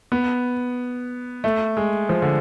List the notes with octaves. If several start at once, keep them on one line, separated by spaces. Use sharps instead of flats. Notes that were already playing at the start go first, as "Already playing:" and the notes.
B3
A3
G#3
F3
D3